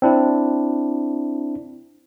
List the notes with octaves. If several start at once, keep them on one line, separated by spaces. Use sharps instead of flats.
C4 D4 E4